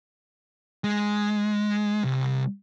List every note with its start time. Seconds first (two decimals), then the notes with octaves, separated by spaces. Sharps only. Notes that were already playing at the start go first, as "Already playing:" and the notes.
0.84 G#3
2.04 C2